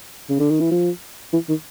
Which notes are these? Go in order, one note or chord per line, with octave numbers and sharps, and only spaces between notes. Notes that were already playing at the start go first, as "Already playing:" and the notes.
C#3
D3
D#3
E3
F3
E3
D#3